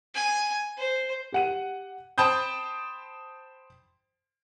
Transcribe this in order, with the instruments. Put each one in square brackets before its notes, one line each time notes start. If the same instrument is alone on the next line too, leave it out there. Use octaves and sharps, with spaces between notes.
[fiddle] G#5
C5
[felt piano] G4 F#5 D#7
[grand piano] C5 G5 A5 B5 D#6 G6